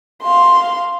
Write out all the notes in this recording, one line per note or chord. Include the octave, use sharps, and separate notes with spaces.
F5 C6